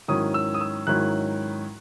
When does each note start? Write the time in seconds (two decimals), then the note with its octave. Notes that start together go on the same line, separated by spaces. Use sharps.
0.08 G#2 D#3 F#3 C#4 E4 D#6
0.34 E6
0.54 D#6
0.61 E6
0.87 G#2 D#3 F#3 C#4 E4 F#6